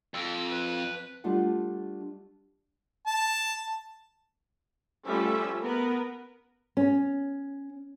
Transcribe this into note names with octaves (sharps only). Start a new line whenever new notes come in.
F2 E6
B4
G3 A3 D4 F4 F#5
A5
F3 G3 A3 C#4 E5
B3 A#4 B4
C#4